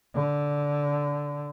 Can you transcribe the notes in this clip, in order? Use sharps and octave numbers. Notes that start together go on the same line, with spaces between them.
D3